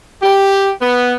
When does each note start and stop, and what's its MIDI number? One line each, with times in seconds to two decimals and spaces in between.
0.22 0.71 67
0.81 1.17 59